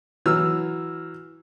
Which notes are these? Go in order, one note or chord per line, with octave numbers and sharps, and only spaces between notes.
E3 F#3 E6 F6